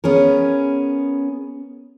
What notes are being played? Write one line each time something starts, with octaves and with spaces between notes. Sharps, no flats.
B3 C#4 G#4 A#4